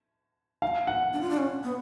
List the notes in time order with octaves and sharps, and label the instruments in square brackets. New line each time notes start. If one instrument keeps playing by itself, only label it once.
[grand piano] F5
F#5
[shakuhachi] D4
F4
D4
C#4
B3